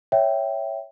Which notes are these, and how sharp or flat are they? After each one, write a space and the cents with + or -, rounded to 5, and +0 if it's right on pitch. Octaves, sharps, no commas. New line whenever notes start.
C#5 +5 E5 +0 G5 +0